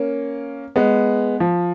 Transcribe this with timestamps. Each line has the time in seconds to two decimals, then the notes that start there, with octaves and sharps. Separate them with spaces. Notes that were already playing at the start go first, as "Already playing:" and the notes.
Already playing: A#3 C#4
0.76 G#3 B3
1.40 F3